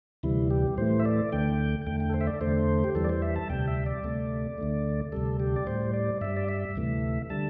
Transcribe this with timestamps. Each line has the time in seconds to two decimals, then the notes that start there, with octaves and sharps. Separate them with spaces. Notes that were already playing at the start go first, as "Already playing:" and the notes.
0.23 D2 C3 E3 G3 E4
0.51 G4
0.78 A2 E3 A3 C5
1.00 E5
1.05 D5
1.32 D2 D3 A3 G5
1.86 E2 D3 A3 G5
2.00 G5
2.10 A4
2.14 C5
2.21 E5
2.27 D5
2.41 E2 D3 A3 C5
2.84 G4
2.95 E2 E3 G3 A4
3.04 D5
3.09 C5
3.22 E5
3.36 A5
3.49 D2 C3 G3 G5
3.68 E5
3.86 D5
4.04 D2 C3 A3
4.58 D2 D3 A3
5.12 D2 C3 G3 A4
5.40 G4
5.56 D5
5.67 A2 G3 C5
5.94 D5
6.21 G2 G3 E5
6.37 D5
6.49 E5
6.76 D2 C3 E3 A3
7.30 D3 G3 A5